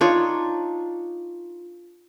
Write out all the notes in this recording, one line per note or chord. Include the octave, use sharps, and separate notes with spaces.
D4 D#4 F4 C#5